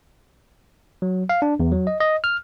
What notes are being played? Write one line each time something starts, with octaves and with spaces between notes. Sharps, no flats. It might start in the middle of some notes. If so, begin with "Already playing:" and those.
F#3
F5
D4
E2
F#3
D#5
D#5
F6